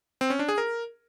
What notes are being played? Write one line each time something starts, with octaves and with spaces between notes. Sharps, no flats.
C4
C#4
D4
G#4
A#4